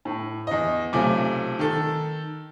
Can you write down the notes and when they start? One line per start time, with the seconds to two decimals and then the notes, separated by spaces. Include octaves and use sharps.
0.05 A2
0.47 E2 D#5
0.93 B1 C3 A3 F4 G#5 D6
1.59 D#3 A4